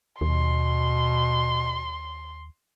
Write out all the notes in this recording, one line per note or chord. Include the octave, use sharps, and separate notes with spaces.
D#2 B2 C6